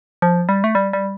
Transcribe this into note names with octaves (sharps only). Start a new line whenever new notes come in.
F3
G3
A3
G3
G3